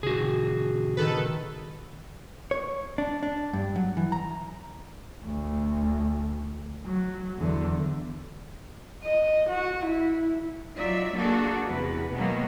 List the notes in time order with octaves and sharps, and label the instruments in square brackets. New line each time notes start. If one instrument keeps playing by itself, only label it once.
[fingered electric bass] A#2 C#3 [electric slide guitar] F#4 G#4
[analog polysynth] D#3 A4 B4
[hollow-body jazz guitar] C#5
D4
D4
G2
F#3
E3
A#5
[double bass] D2
F#3
E2 D3
[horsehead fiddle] D#5
F#4
E4
[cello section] F#3 D#4 F4 D5 E5
A#3 D4 F#4 G#4 A4
E2 C3 B4
B2 D#3 F#3 G#3 A#3 B3